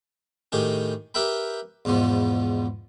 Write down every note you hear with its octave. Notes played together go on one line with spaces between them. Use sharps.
A2 D#3 G4 G#4
G4 A#4 B4 E5 G5 B5
E2 G#2 B2 F3 B3